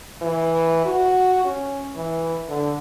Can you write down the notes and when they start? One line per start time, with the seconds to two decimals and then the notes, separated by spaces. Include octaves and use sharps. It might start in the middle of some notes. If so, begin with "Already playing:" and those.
0.22 E3
0.85 F#4
1.45 C#4
1.96 E3
2.48 D3